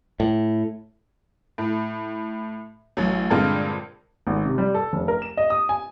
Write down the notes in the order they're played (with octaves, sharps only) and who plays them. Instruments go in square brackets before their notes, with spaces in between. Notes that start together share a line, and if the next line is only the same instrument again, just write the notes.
[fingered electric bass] A2
[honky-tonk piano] A2
A1 F#3
G2 A#2 D3 G#3 C4 F4
[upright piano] G#1
C3
G3
A4
F1
A#4
E7
D#5
D#6
G#5